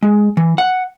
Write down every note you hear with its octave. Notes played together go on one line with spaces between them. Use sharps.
G#3
E3
F#5